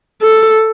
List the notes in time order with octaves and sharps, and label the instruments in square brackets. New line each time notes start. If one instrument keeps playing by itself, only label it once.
[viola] A4